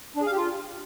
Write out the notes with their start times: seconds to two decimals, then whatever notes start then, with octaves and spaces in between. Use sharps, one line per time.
0.16 D4
0.21 G#4
0.27 F5
0.32 G4
0.37 F4